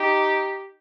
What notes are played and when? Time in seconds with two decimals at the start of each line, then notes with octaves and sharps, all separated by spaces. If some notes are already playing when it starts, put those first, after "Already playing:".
Already playing: D#4 G4